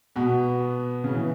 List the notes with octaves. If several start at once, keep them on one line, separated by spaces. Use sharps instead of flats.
B2 B3
C#3
E3